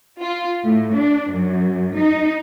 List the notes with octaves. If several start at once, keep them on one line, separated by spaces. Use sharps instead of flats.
F4
A2
D4
F#2
D#4